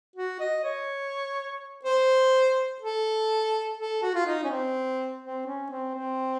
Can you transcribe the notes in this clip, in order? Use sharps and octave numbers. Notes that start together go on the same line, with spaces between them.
F#4
D#5
C#5
C5
A4
A4
F#4
F4
D#4
C#4
C4
C4
C#4
C4
C4